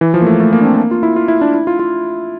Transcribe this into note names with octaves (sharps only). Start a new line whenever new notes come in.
E3
F3
A#3
A3
A3
A#3
D4
C4
A#3
F4
E4
F4
E4
D4
E4
F4
F4